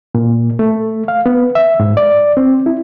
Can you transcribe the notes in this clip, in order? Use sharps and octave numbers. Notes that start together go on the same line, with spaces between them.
A#2
A3
F5
B3
E5
G#2
D5
C4
E4